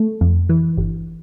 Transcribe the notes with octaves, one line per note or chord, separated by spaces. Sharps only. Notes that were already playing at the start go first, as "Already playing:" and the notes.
Already playing: A3
F2
E3
G1